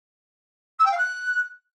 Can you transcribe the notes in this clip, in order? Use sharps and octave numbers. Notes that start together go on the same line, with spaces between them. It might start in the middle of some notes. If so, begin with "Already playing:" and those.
E6
G5
F5
F#6